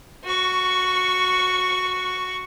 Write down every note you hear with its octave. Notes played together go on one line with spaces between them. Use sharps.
F#4 C#6